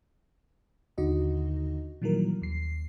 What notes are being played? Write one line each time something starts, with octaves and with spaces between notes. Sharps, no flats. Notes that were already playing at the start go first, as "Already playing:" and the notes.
D#2 D3 D#4 F#4 D#5
A#2 D#3 E3 F#3 G3 A#4
D#2 C7